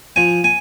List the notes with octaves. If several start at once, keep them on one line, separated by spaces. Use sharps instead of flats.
F3 G#5
G#5